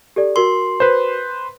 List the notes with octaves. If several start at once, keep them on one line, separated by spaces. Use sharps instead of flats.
G4 A4 D5
F#4 A#4 C6 G7
B4 C5